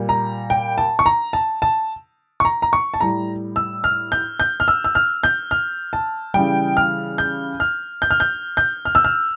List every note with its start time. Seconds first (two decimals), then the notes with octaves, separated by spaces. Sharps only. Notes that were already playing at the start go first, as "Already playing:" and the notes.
Already playing: A#2 G3
0.09 A#5
0.50 G5
0.78 A5
0.99 C#6
1.06 A#5
1.33 A5
1.62 A5
2.40 C#6
2.45 A#5
2.62 A#5
2.73 C#6
2.94 A5
3.00 A2 G3 A#5
3.56 E6
3.84 F6
4.12 G6
4.40 G6
4.60 F6
4.68 E6
4.84 E6
4.95 F6
5.23 G6
5.51 F6
5.93 A5
6.34 C#3 E3 G3 G5
6.77 F6
7.18 G6
7.60 F6
8.02 G6
8.11 F6
8.20 G6
8.57 G6
8.85 F6
8.95 E6
9.05 F6